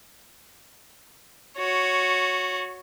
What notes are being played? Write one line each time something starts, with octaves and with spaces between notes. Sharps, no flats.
F#4 C#5